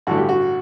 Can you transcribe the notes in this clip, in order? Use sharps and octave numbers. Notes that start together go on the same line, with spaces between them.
A1 G2 D3 F#4
G4
F#4